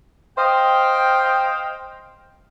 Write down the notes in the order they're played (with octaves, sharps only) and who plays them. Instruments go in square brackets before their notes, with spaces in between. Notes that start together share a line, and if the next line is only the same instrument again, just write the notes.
[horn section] C5 D#5 F5 G5